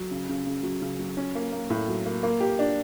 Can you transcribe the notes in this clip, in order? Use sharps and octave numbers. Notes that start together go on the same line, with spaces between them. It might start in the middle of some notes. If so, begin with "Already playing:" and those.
Already playing: F#3
C#3
C#3
C#3
F#3
C#3
F#3
C#4
A#3
A#3
A2
F#3
A#3
A#3
G4
D4